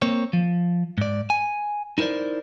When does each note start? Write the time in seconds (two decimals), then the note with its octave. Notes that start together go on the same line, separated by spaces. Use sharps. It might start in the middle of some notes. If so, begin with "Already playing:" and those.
0.02 A#3 C4 C#5
0.33 F3
0.98 G#2 D5
1.30 G#5
1.98 D#4 E4 A#4 C5 D5